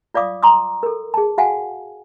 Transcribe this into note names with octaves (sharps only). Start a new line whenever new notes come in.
F4 D5 F5 D6 D#6
A#5 C6 D6 D#6
A4 A#4
G#4 A5
F#4 F5 F#5 G#5